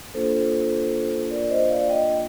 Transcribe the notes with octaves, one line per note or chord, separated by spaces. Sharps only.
A#3 D4 F4 A4 C5
A#4 D5
C5 D#5
D5 F5
D#5 G5